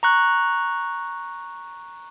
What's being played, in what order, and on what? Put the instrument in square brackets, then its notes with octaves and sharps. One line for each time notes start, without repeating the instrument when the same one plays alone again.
[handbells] A#5 C#6 F#6